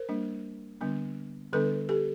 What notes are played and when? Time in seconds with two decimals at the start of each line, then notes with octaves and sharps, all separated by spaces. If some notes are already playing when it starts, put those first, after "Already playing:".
Already playing: A#4 C5
0.09 G3 A#3 D4
0.81 D3 G3 B3 D4
1.53 D3 G3 B3 D4 A4 B4
1.89 G4 A4